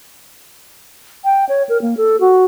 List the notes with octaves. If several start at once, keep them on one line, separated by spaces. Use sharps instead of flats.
G5
C#5
A#4
A#3
A4
F#4